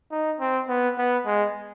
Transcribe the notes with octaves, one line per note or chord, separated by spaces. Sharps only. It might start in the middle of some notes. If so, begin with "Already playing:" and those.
D#4
C4
B3
B3
G#3